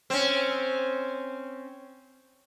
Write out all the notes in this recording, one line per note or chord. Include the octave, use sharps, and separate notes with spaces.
C4 C#4